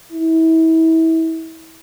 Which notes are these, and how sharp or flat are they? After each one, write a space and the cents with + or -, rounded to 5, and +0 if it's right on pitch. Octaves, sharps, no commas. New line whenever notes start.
E4 -30